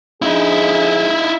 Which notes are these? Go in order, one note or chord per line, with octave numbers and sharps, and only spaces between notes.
D3 F3 D#4 E4 G#4